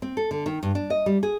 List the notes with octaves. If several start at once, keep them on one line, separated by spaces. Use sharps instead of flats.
C4
A4
D3
D#3
G2
D4
D#5
G3
G#4